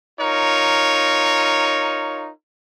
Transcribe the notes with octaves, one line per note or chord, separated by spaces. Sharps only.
D#4 F4 A#4 C#5